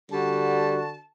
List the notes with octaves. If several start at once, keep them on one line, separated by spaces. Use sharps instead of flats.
D3 G3 F#4 A5